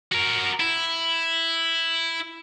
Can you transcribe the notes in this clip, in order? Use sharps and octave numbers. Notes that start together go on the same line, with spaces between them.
F#4 A#4
E4